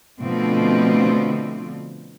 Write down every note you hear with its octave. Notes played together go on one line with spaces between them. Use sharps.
B2 D3 F3 A3 C4